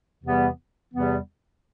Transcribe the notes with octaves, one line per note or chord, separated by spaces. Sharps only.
E2 C3 E3 G3 B3
E2 C3 E3 G3 B3